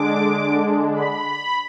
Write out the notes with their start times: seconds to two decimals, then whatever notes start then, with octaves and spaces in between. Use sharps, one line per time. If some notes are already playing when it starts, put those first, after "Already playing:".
Already playing: D3 G#3 D4 D6
0.94 B5